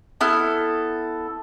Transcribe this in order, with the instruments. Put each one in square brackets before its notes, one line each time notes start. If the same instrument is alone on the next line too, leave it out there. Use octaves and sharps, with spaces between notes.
[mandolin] B3 E4 A4 F6